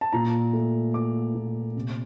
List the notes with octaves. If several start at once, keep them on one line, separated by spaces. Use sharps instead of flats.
A5
A#2 A#5
A3
A3 D6
A#2
C3